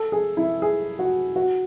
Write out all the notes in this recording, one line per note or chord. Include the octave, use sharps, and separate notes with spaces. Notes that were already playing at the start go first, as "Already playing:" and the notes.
Already playing: A4
G#4
E4
G#4
F#4
F#4